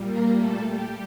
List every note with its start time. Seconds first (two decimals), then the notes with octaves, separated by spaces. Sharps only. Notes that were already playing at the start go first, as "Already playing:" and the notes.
Already playing: A#2 G3
0.08 A#3 A#4
0.37 A3 A4
0.67 G3 G4